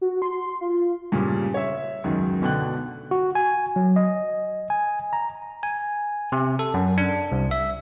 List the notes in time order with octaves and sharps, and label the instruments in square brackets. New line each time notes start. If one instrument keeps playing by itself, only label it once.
[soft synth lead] F#4
C6
F4
[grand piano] G2 A#2 C#3
C#5 E5
C#2 F#2 D#3
B2 D3 G5 F#6
[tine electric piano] F#4
G#5
F#3
D#5
G#5
A#5
G#5
C3
A4
F#2
D4
C2
E5